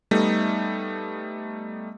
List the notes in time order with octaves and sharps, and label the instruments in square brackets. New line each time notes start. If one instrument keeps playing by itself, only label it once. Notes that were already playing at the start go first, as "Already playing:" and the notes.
[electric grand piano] G3 A3 B3 D#4